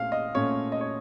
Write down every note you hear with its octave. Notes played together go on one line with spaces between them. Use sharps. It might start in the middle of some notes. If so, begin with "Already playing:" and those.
Already playing: A#2 A3 C#4 F5
D#5
A#2 A3 C#4 C#5
D#5
C#5